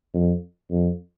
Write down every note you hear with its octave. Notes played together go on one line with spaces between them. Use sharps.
F2
F2